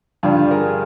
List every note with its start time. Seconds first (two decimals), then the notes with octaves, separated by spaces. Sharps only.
0.23 G2 D3 G3 F4
0.51 G#4 A#4